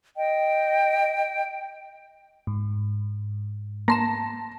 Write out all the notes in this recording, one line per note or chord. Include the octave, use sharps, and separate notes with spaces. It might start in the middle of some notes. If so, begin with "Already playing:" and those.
D#5 G5
G#2
A#3 A5 C6 A#6 E7